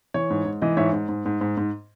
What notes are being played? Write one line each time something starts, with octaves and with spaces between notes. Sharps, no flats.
E3 C#5
G#2
G#2
E3 D#5
G#2 C#5 E5
G#2
G#2
G#2
G#2
G#2